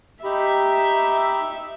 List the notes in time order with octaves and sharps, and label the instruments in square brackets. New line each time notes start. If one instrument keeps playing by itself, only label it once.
[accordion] D#4 G4 B5 [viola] E5